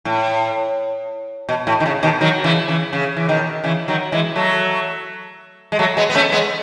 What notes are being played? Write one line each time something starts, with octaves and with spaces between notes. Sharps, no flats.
A2
B2
A2
D#3
C#3
B2 D#3
D#3 F#3
C#3 E3
C#3 E3
C#3
E3
B2 D#3
C#3 E3
D#3 F#3
E3 G#3
F#3 A3
G#3
F#3 A3
G#3 B3
B3
A3 C#4
G#3 B3